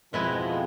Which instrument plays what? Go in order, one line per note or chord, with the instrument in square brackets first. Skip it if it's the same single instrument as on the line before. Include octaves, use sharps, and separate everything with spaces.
[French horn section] F2 F3 [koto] B2 G#3 B3 E4